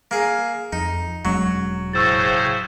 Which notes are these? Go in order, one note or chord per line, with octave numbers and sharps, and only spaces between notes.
A#3 G#4
F2 D#4
E1 F#3 G#3 C#4
A2 C#3 C5 C#6 E6 A6